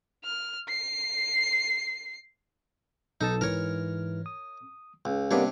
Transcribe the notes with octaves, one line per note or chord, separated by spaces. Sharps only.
F6
C7
B1 D#4 A4 A5
G#2 E3 A#4 C#5 F6
D#6
C#2
C3 G3 A#3 B3 D4 C#5